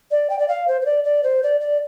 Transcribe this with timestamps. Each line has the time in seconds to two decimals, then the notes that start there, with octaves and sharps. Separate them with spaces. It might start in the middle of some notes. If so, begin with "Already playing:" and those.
0.11 D5
0.30 G5
0.39 D5
0.48 F5
0.68 C5
0.82 C5
0.86 D5
1.04 D5
1.23 C5
1.43 D5
1.61 D5